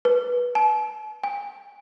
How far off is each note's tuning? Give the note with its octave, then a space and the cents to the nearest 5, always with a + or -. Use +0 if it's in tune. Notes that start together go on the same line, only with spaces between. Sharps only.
B4 -10
A5 -40
G#5 -35